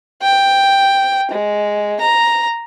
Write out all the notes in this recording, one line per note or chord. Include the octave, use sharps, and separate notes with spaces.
G5
G#3
A#5